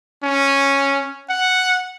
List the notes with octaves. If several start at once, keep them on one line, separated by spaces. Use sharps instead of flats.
C#4
F#5